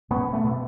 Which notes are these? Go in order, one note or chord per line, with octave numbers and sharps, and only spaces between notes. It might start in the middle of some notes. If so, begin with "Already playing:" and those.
B2 B3 C#4
A3 B3
B2